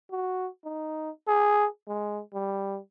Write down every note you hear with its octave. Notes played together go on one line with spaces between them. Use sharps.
F#4
D#4
G#4
G#3
G3